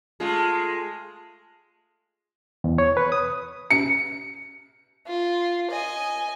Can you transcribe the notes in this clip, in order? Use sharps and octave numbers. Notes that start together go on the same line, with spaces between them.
G#3 A3 F4
E2
C#5
B4
D#6
C#7
F4
D#5 G#5